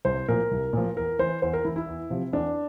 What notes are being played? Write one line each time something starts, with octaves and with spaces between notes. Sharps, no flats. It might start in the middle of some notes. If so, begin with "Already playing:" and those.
C2 C5
A#2 F3 A#4
C2
A#2 F3
E2 A#4
E3 C5
E2 C5
A#4
E3 E4
E4
E2
C3 F3
E2 D4